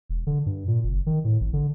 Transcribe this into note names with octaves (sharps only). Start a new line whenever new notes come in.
E1
D3
G2
A#2
F#1
D#3
A2
G#1
D3